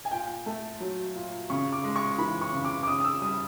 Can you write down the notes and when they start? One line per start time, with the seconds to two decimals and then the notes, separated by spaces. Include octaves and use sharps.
0.05 G#5
0.11 A#2 G5
0.46 A3
0.80 F#3
1.15 A#2
1.50 C#3 C#6
1.72 D6
1.84 G#3
1.96 C#6
2.18 E3 B5
2.41 C#6
2.53 C#3
2.65 D6
2.83 D6
2.87 C#3 D#6
3.00 D#6
3.04 E6
3.22 G3 D#6